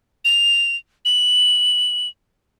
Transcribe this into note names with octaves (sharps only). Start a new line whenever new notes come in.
F7
F#7